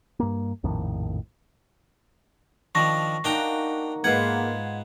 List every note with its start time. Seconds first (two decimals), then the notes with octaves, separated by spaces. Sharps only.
0.19 G2 A#3
0.63 A#1 F2 A2 D#3
2.75 D#3 F3 D4 C#6 A#6
3.24 A#3 D4 D#4 F#4 G5 A#5
4.04 G#2 G#3 A#3 B3 F4 B4 F#5 G#6